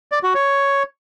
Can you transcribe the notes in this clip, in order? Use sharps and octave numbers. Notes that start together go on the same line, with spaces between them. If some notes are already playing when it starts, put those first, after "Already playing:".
D5
F#4
C#5